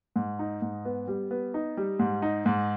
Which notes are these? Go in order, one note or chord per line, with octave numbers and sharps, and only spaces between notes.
G#2
D#4
G#2
B3
G3
B3
D#4
G3
G#2
D#4
G#2